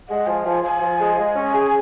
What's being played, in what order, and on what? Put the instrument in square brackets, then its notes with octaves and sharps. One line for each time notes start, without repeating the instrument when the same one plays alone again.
[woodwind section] G#3 [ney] F#5
[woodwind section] F3 [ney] G#5
[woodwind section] F3 [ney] G#5
[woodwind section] F3 [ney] G#5
[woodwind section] F3
G#3
G#3
C#4
G#4